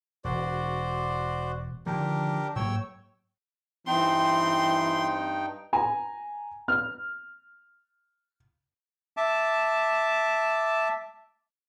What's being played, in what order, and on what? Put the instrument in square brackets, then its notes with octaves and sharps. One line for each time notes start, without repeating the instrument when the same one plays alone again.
[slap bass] E1 [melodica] F#4 C5 D5
[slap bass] D3 D#3 F3 [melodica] D4 G4 A#4
[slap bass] G#2 F#3 A#3 [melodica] C#5 G5 E6
[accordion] G2 D#4 G5 [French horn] E3 [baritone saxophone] C4 [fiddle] C6
[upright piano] G#5 A#5
F6
[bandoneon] E5 A5 D6